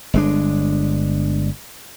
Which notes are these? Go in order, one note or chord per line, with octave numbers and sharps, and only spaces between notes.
G1 G#3 D4